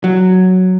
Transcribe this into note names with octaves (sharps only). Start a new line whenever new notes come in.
F#3